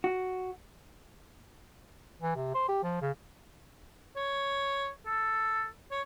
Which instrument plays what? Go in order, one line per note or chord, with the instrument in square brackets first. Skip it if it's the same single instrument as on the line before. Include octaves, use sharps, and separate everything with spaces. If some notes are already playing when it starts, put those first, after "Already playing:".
[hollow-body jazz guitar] F#4
[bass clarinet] E3
C3
C5
G4
F3
C#3
[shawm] C#5
A4
C#5